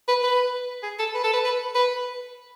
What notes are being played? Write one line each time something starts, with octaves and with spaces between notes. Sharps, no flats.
B4
B4
G#4
A4
B4
A4
B4
B4
B4